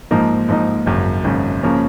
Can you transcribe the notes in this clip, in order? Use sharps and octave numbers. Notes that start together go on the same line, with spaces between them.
G#2 F3 A#3 D#4
G#2 F3 A#3 D#4
G#1 F#2 C#3
G#1 F#2 C#3
C#3 F3 A#3 C#4